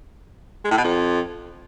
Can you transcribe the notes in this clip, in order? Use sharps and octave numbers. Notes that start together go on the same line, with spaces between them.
G#3
A2
B2
F2